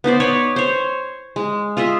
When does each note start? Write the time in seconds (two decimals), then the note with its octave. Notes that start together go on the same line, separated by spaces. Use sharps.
0.04 B3 D#4 C5 D5
0.20 B3 B4 C#5 D5
0.56 C5 C#5
1.36 G#3
1.77 F4 G#4 D#5 E5